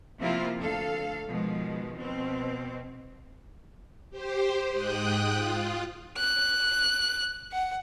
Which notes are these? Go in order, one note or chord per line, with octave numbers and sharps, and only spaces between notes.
C3 F3 A#3 C4 E4 F4
D2 A4 F5
B2 D#3 F3 G#3
B2 C4
G4 C5
G#2 G5 D#6 F#6
F4
F#6
F#5